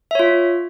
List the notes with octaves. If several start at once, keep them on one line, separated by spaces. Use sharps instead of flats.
F4 C#5 E5